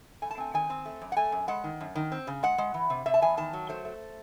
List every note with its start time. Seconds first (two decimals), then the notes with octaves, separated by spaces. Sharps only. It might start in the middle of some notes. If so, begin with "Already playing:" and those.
0.22 A3 G#5
0.31 A5
0.38 C4 G#5
0.54 D#3 G#5
0.70 C4
0.86 A3
1.02 F#2
1.12 F#5
1.17 A3 G#5
1.32 F#2
1.48 G#3 F#5
1.64 D#3
1.81 F#2
1.96 D#3
2.12 C4
2.27 C#3
2.43 G#3 F#5
2.58 G#3
2.74 E3
2.90 C3
3.06 C3 E5
3.14 A5
3.22 E2 G#5
3.37 D#3 A5
3.53 F#3
3.69 A3 C5
3.85 A3